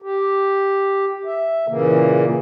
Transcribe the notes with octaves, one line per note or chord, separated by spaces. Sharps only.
G4
E5
A#2 C#3 E3 A#3